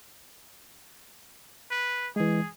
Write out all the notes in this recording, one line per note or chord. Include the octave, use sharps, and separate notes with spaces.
B4
E3 G#3 G#4